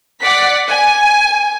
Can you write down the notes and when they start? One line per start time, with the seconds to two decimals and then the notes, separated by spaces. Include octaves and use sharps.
0.22 D5 F#5 B6
0.68 G#5